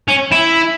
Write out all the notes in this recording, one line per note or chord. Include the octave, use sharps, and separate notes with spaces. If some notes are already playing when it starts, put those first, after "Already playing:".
C#4
E4